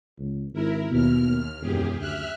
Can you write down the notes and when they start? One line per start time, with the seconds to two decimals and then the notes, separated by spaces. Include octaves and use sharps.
0.19 C#2
0.53 G#1 E4 A#4
0.90 D#2 B2 F6
1.61 E1 F#2 G4 G#4
1.99 D2 E5 F6 F#6